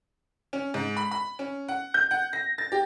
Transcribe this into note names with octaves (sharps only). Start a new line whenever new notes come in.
C#4
G#2
B5
B5
C#4
F#5
G6
F#5
A#6
A6
G4